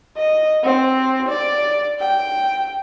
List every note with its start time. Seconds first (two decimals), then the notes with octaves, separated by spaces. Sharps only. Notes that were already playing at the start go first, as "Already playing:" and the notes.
0.17 D#5
0.64 C4
1.29 D5
1.99 G5